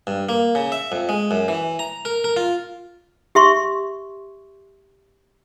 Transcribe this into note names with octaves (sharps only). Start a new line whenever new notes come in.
G2
A#3
C#3
E5
F2
G#3
F#2
E3
A#5
A#4
A#4
F4
G4 E5 C6 C#6